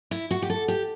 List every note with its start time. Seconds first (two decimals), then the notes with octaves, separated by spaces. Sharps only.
0.11 E4
0.31 F#4
0.42 G4
0.50 A4
0.68 G4